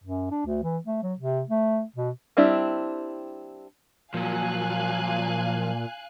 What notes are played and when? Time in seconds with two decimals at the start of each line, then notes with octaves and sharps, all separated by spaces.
0.04 F#2
0.31 D4
0.46 D2
0.63 E3
0.86 A3
1.03 F#3
1.19 C3
1.49 A3
1.96 B2
2.37 G3 C4 D4 E4 G4
4.14 A#2 F3 F#3 F5 G#5 F#6